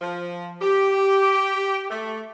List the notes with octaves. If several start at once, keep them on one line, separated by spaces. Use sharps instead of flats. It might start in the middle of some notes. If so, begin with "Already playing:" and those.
F3
G4
A3